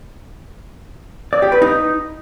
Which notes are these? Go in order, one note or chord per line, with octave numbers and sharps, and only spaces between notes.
D5
G4
B4
D#4